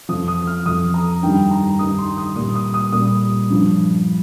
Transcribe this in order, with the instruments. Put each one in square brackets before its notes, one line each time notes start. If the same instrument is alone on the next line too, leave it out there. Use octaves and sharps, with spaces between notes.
[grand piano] F3 D#6
F2
D#6
F6
F2 F3 D#6
A#5
G2 D#3 G3 G5
A#5
G2 D#3 G3 D#6
C6
D#6
A#2 G3 D#6
D#6
D#6
A#2 G3 D#6
G2 F3